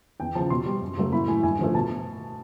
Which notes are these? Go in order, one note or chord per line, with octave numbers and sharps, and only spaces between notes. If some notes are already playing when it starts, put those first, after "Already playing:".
E2 G5
C#3 F3 A5
B2 C6
G3
F#2
C#3 F#3 A3
A2 B5
E3 A3 G#5
G2 G#5
D3 F3 A3
B2 A5